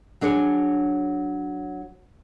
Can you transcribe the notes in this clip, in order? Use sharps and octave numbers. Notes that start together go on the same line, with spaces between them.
F#3 D4 G#4 C#5